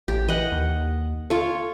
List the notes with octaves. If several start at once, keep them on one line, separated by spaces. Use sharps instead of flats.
A1 G4
E3 D#5 F#5
D#2
F4 A4 C#5